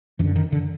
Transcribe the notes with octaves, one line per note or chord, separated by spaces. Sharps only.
F#2 D3 E3
D#3
D3